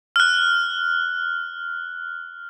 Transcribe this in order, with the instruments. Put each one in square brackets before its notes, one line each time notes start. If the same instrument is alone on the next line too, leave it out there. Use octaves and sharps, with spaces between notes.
[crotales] F6 F#6